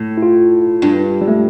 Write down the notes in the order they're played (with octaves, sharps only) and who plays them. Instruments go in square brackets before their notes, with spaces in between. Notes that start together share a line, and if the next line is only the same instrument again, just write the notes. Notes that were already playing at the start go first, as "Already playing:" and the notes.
Already playing: [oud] A2
[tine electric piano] E4
F4
[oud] G2 [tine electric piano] D4
[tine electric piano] G3
A3